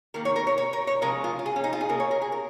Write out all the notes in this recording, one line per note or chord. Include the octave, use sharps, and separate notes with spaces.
D#3 A#3 A#4
C#5
A#4
C#5
C#5
A#4
C#5
C#3 F3 G#3 A#4
F4
F4
G#4
C#4
D#4
F4
G#4
C#3 A#3 A#4
C#5
A#4
G#4
A#4